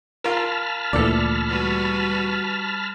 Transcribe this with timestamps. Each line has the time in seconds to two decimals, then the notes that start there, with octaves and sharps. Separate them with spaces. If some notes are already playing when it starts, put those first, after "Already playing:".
0.24 F4 A#4 A5 B5 F6
0.93 D2 A#2 E3 A4 D5
1.48 G3 F#4 B4